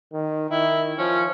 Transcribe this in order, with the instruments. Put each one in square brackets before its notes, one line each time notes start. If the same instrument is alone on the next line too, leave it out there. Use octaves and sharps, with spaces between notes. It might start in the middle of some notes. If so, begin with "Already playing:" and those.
[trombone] D#3
[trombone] D#3 [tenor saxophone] E4
[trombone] F3 [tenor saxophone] C#4